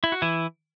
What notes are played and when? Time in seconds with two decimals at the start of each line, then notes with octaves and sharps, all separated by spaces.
0.04 E4
0.12 F#4
0.22 E3 E4